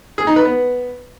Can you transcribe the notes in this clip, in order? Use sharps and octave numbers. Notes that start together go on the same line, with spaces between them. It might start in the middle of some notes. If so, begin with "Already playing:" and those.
G#4
D#4
B4
B3